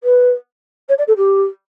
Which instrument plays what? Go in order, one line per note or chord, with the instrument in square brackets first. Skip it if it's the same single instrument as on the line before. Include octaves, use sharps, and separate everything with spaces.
[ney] B4
C#5
D5
A4
G4